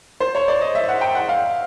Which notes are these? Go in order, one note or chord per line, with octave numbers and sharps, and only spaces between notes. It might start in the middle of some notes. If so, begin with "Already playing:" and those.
C5
C#5
D5
D#5
E5
F#5
G5
F#5
F5